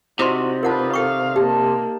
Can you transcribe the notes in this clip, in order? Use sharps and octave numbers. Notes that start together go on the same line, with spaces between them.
C3 D#4 E4 F#4 C5 D5 C6
F4 A#4 B4 F#5 A5
A4 F5 G5 C#6
A#3 G4 A5